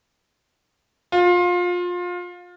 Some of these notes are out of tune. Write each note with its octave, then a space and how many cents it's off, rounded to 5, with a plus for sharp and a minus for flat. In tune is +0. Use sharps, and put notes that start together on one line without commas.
F4 +25